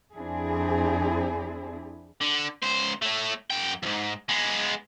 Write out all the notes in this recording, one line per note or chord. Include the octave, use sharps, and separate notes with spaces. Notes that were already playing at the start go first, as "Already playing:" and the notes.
F2 C4 D4 E4 G#4
D3
C#2 C5
A3 C#5
F#2 G5
F2 G#2
G#3 B3